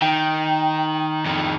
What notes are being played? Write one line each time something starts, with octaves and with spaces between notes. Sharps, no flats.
D#3 G5
F2 D#3